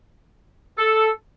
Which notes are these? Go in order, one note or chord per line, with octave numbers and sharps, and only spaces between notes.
A4